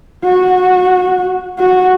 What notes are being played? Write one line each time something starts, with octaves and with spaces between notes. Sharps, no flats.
F#4
F#4